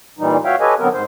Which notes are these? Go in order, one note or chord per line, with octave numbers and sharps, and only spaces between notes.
A#2 E3 G3 D#4
F#4 C#5 E5 F5 G5
G4 A4 B4 C#5 D#5 G#5
D3 F#3 B3 C4 A#4
G#2 C5